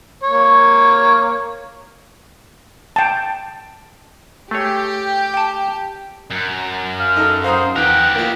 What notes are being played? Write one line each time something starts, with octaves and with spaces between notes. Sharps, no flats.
A#3 C#5
G5 A5
A3 G4 G#4 C#5
G5 A5
F#2
F5
D#4 A4
C5 F5 A#5 D#6
E2 G4 A#4 F#5
A#3 F4